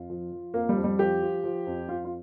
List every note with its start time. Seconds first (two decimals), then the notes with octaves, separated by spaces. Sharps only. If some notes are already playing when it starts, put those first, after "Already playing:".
Already playing: F2 F4
0.10 F3
0.32 F3
0.54 F2 A#3
0.69 G3
0.76 F2
0.84 G3
0.99 F3 G4
1.22 F3
1.44 F3
1.66 F2
1.89 F2 F4
2.05 F4